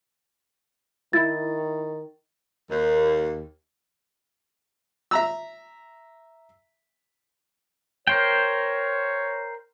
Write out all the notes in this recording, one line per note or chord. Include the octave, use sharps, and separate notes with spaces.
D#3 E4 A6
D#2
E5 A#5 E6
A#4 C5 C#5 G5